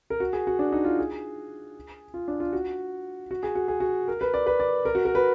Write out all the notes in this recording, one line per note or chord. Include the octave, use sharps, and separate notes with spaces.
A#4
F#4
G#4
F#4
D4
D#4
F4
G#4
F4
D4
F4
F#4
F#4
G#4
F#4
G#4
F#4
A#4
B4
D5
B4
D5
A#4
F#4
A#4
B4